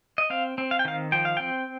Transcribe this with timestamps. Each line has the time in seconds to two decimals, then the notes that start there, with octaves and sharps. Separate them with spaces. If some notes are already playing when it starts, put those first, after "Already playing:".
0.18 D#5
0.30 C4 F5
0.58 C4
0.71 F5
0.79 G5
0.85 D#3 F5
1.12 F3 G5
1.25 F5
1.37 C4 G5